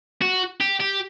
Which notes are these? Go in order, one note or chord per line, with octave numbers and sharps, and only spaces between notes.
F#4
G4
G4